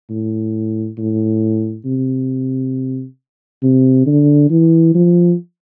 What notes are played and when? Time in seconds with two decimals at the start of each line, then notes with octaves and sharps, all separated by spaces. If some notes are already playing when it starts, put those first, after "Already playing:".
0.10 A2
0.99 A2
1.86 C3
3.63 C3
4.06 D3
4.50 E3
4.95 F3